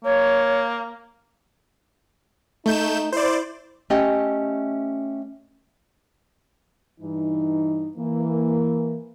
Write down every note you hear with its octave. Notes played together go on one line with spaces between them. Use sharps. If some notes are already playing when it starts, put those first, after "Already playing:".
A#3 C#5
A3 D#4 G6 E7
E4 C5 D5
A3 C#4 G4 D#5 E5 G5
G2 E3 D#4
E3 A#3